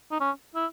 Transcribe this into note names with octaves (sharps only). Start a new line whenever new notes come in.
D#4
C#4
E4